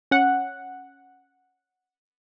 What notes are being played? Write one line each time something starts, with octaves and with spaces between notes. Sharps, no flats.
C#4 F#5